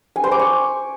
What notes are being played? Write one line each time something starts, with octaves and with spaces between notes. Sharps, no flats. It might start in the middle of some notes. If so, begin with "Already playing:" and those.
G#5
C5
D6
C#6